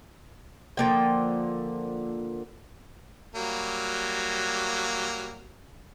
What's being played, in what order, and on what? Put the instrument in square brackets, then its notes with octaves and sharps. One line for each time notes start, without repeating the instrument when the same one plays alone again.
[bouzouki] D3 F3 A#3 G5
[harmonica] F#3 G3 A#3